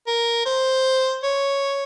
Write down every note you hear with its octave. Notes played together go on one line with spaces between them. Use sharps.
A#4
C5
C#5